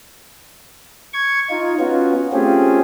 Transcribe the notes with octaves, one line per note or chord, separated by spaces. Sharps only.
C#6 G#6
D#4 F4
B3 C#4 F4 F#4
A3 C4 C#4 F4 G4 G#4